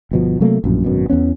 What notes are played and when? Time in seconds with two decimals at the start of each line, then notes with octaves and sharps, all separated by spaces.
0.11 G1 B2 F3
0.40 C3 F#3 A3 A#3
0.64 A#1 F#2 A2
0.85 G#1 F#2 B2
1.10 E2 E3 B3 C#4